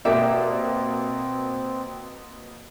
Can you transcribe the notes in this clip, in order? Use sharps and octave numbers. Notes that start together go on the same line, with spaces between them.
B2 A#3 C4 G4 D5 E5